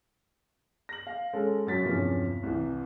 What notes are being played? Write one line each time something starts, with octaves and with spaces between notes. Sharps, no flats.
A#6 F#7
F5
G#3 C#4 A4
F#2 F#4 A6 B6
E2 G2 C3 F3 C#4
C2 E3